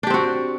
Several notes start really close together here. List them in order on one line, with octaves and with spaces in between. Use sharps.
D4 G4 C4 F#4